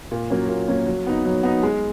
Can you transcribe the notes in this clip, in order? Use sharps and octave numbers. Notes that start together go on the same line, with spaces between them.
A#2
F#3 A#3 C#4
A#2
F#3 A#3 C#4
F#3
B3 D#4
F#3
B3 D#4
G#3